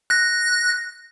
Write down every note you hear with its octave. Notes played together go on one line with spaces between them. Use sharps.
F#6 A#6